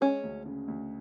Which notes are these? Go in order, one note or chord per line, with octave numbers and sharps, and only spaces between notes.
G#3 C#4
D2
C#3
D2